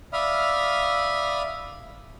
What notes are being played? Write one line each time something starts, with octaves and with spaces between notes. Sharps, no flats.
D5 E5 F5 B5 D#6 F6